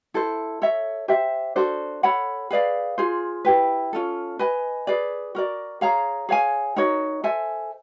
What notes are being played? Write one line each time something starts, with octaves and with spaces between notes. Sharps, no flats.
E4 A4 C5
A4 C#5 E5
G4 C5 E5
D4 F#4 A4 C5
A4 C#5 F#5 B5
G#4 B4 D5 F5
F4 G#4 C5
E4 G4 B4
C#4 F4 A4
B4 D#5 G#5
G#4 B4 D5
F#4 A#4 D5
G#4 C#5 F5 A#5
G#4 C#5 F5 G#5
D#4 F#4 A#4 C#5
A4 C5 E5 G#5